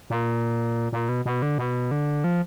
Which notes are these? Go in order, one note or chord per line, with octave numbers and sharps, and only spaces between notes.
A#2
A#2
B2
B2
D3
B2
D3
F3